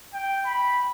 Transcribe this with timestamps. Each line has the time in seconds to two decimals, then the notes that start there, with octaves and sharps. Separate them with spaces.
0.13 G5
0.45 B5